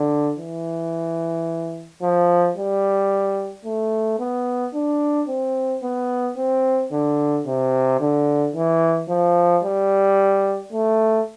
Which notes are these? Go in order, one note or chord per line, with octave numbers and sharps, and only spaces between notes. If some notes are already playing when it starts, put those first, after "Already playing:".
Already playing: D3
E3
F3
G3
A3
B3
D4
C4
B3
C4
D3
C3
D3
E3
F3
G3
A3